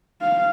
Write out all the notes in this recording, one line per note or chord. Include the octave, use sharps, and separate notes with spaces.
F5